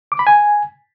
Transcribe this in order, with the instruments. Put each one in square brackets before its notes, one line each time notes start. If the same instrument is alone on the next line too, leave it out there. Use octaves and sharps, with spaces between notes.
[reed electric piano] D6
B5
G#5